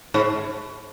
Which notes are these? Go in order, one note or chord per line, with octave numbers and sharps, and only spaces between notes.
G#2